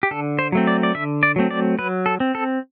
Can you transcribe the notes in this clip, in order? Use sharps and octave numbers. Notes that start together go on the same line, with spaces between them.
G4
D3 A4
C5
F#3 A3 C4
D5
D5
D3 E5
D5
F#3 A3 C4
D5
F#3 B4
A4
C4
A4